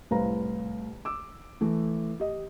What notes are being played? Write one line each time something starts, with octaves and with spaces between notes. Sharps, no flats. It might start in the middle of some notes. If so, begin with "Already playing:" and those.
C2 A2 B4 C5 F5 A#5
D6 E6
E3 A3
G4 D#5